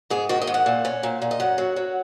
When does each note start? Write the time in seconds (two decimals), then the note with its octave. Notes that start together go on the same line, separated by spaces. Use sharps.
0.10 G#2 G#4
0.29 D#3 F#4
0.42 D#5
0.47 G#2
0.54 F#5
0.66 A#2
0.85 C#4
1.03 A#2
1.22 A#2
1.31 D#5
1.40 F#2 F#5
1.58 F#3
1.76 F#3